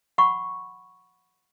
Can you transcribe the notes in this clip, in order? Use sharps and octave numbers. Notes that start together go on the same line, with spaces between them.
F#5 B5 C#6